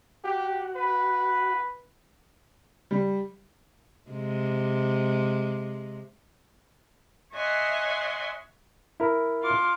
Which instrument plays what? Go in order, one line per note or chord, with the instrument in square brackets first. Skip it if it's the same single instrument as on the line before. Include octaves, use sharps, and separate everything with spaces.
[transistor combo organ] F#4 [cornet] G4
[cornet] B4
[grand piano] G3
[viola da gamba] C3 G#3
[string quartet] C#5 D#5 E5 F#5 G#5 C6
[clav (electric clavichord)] E4 A#4
[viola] F4 D6